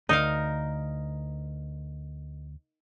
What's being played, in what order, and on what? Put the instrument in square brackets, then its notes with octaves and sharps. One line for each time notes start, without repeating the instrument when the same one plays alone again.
[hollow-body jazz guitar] D2 [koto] D#4 A#4 F5